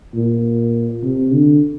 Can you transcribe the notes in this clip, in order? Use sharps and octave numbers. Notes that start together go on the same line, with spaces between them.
A#2
C3
D3